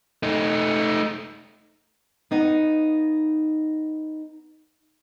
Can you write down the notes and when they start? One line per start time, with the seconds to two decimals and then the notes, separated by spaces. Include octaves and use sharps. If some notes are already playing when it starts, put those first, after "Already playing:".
0.23 A3 D#4
2.31 B3 D#4 F5 F#5